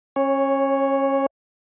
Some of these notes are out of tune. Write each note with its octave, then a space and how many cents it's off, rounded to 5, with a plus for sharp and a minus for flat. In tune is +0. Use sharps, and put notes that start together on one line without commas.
C#4 -30 C#5 +0